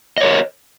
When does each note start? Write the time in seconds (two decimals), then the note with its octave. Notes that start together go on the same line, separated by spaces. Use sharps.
0.18 D#5
0.21 C#5
0.24 A#4